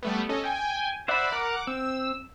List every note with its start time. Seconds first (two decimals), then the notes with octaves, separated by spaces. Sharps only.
0.03 G3 A3 B3
0.29 C#4 A4 D#5
0.44 G5 G#5
1.08 C5 D5 E5 F#5 B5
1.32 A#4 F#5 D6
1.67 C4 E6